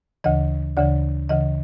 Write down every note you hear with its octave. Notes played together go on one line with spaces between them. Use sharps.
D2 C#3 E3 D#5
D2 C#3 E3 D5
D2 C#3 E3 D#5